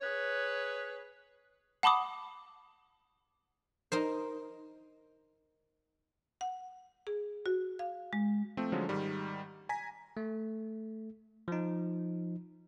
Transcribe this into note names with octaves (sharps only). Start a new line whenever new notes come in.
G#4 B4 C#5
F#5 A5 B5 D6 D#6
D#4 A#4 C5
F#5
G#4
F#4
F5
G#3
F3 A3 C4
D3 F3 F#3 G#3 C#4
G#2 D#3 G3
G#5 A#5 A#6 B6
A3
F3 D#4